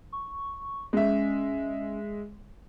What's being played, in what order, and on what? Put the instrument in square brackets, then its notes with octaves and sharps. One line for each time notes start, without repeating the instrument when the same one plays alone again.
[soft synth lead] C#6
[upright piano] G#3 E5 [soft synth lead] C#4